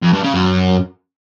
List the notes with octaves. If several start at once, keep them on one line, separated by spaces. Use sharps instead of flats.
F2
G2
C#3
F#2